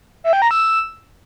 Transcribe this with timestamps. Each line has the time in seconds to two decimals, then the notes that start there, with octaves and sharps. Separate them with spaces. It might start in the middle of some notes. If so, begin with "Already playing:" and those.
0.24 E5
0.33 G5
0.42 A#5
0.51 E6